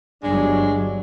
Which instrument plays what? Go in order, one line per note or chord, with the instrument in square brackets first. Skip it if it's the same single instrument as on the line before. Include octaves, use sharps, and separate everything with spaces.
[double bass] G1 F#3 [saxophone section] G#3 D4